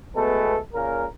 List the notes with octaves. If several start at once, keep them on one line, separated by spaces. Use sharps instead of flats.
B2 G#3 A3 B3 A4
A#2 C#3 A#4